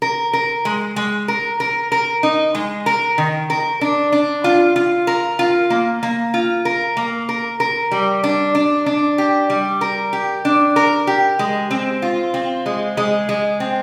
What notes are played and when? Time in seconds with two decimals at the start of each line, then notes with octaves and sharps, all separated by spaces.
0.02 A#4
0.33 A#4
0.65 G#3
0.96 G#3
1.28 A#4
1.60 A#4
1.92 A#4
2.23 D#4
2.55 G#3
2.86 A#4
3.18 D#3
3.50 A#4
3.81 D4
4.12 D4
4.44 F4
4.76 F4
5.07 A#4
5.39 F4
5.70 A#3
6.03 A#3
6.34 F4
6.65 A#4
6.97 A#3
7.29 A#4
7.60 A#4
7.91 G3
8.24 D4
8.55 D4
8.86 D4
9.18 G4
9.50 G3
9.81 A#4
10.13 G4
10.45 D4
10.76 A#4
11.07 G4
11.39 G#3
11.71 C4
12.02 F4
12.34 C4
12.66 G#3
12.97 G#3
13.29 G#3
13.60 C4